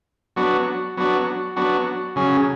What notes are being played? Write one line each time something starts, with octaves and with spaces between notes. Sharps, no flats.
F#3 B3 D4 F#4
F#3 B3 D4 F#4
F#3 B3 D4 F#4
C#3 F#3 C#4 G#4